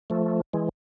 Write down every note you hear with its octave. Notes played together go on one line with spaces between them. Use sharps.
F3 A3
E3 G#3